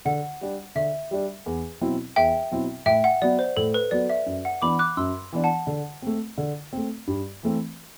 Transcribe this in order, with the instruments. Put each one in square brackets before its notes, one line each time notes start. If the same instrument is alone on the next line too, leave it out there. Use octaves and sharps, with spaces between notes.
[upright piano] D3 [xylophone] F#5
[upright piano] G3 D4
[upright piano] D3 [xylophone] E5
[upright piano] G3 D4
E2
B2 F#3 C4 E4
[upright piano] E2 [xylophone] E5 G5
[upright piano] B2 F#3 C4 E4
[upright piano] A2 [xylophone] E5 G5
[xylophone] F#5
[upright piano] F#3 B3 [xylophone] D5
[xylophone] C5
[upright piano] A2 [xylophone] A4
[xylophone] B4
[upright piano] F#3 B3 [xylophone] D5
[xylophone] E5
[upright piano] F#2
[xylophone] F#5
[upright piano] E3 B3 D4 [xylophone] B5 D6
[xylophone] D6 F#6
[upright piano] F#2 [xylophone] C6 E6
[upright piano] E3 B3 D4
[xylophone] F#5 A5
[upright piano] D3
A3 C4
D3
A3 C4
G2
E3 A3 C4